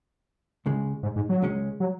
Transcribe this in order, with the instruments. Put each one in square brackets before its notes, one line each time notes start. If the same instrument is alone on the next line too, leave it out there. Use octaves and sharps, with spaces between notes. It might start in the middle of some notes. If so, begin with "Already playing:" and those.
[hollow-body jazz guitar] C#2 C#3 G#3
[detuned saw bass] G#2
G#2
F#3
[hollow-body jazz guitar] C#2 C#3 G#3 C#4
[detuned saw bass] F#3